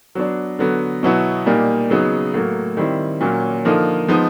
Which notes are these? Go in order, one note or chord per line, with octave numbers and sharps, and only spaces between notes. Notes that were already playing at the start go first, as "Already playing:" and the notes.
F#3 B3 D4
D3 F#3 B3
B2 F#3 B3 E4
A#2 G3 A#3 D#4
C#3 F#3 B3 D#4
A2 F#3 A#3
D#3 G3 C4 E4
A#2 F#3 A#3 C#4
D3 F3 A#3 D#4
F3 G#3 B3 D#4